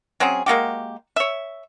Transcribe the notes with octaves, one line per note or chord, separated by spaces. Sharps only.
F#3 C4 C#4 G#4
G#3 A#3 F#4 G4
C#5 E5